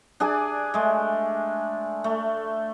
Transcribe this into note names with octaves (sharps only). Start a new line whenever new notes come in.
D4 G#4 D5 G#5
G#3 A3
A3